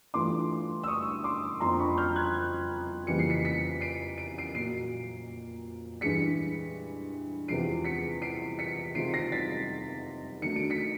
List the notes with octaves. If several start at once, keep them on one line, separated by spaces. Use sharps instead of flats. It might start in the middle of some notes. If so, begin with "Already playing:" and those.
G2 E3 A3 D4 F4 C6 D6
E6
C#6 D#6
C6 D6
F2 D3 F3 A#3 A#5 C6
B5 C#6
F6 G6
F#6 G#6
F2 C#3 E3 G3 A#3 C#7
C7
B6 C#7
B6 C#7
C7 D7
D7
C7 D7
A#2 F#3 A#3 C7 D7
G2 E3 G#3 B6 C#7
E2 C3 F3 G#3 C7 D7
B6 C#7
C7 D7
B6 C#7
C3 D#3 G#3 C4 F4 C7 D7
A#6 C7
A6 B6
D#3 F#3 A3 D4 C#7
D7
B6 C#7